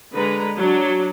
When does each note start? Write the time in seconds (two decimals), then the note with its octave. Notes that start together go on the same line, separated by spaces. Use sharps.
0.15 D3 G#3 B4 A#5
0.57 F#3 D4